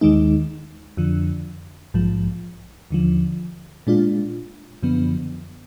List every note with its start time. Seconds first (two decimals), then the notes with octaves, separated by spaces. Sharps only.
0.01 D#2 D#3 G#3 D#4
0.97 F2 D3 F3
1.94 A#1 G#2 F3
2.90 D#2 D3 F3
3.87 A#2 G#3 D4 F4
4.83 F#2 D3 F3 B3